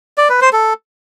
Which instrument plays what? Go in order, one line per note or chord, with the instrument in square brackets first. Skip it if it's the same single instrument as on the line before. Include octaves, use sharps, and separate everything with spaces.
[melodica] D5
B4
C5
A4